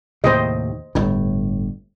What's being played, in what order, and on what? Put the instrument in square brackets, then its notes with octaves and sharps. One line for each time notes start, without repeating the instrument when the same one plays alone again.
[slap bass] D#2 A2 C3 [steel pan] C5 D#5
[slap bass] G1 A2